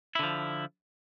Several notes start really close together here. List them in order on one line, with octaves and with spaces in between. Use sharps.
E4 D3 F3